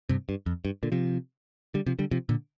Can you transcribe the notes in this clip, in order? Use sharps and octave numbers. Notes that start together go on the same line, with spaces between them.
G2 C3
G2
F2
G2
A#2 D3
C3 F3
D3 G3
C3 F3
D3 G3
C3 F3
A#2 D3